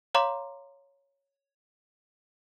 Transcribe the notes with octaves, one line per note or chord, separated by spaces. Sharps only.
C#5 F5 A#5 C6 D6